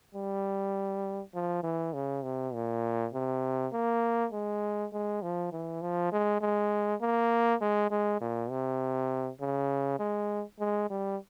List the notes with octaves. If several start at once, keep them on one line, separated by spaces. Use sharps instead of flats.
G3
F3
E3
C#3
C3
A#2
C3
A#3
G#3
G#3
F3
E3
F3
G#3
G#3
A#3
G#3
G#3
A#2
C3
C#3
G#3
G#3
G3